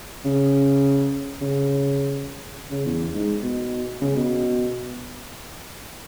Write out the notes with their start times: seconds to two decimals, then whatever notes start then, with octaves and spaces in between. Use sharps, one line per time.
0.25 C#3
1.41 C#3
2.71 C#3
2.85 E2
3.14 G#2
3.43 B2
4.01 C#3
4.16 B2